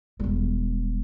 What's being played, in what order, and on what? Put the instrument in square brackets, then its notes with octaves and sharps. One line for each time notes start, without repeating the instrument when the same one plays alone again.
[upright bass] E1 G3